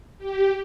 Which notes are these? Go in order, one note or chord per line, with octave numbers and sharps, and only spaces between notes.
G4